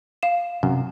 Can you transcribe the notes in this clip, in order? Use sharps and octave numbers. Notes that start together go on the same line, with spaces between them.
F5 E7
F#2 C3